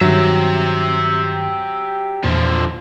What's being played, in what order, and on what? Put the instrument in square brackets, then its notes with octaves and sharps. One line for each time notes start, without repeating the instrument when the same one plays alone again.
[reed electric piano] G2 D#3 [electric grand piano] F#3 [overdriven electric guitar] G4 E5
[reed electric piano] E2 A#2 [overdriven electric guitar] D3 F3